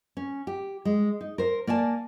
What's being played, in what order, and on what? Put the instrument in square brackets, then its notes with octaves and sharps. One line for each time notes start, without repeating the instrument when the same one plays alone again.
[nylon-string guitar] C#4
G4
G#3
D#4
A#4 C5
A#3 D5 G#5 A5